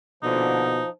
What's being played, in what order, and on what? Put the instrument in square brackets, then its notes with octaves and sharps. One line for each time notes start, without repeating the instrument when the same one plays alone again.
[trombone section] A#1 D3 [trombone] B2 [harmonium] F3 [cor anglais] D#4